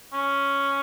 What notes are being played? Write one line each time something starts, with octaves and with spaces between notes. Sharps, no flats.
C#4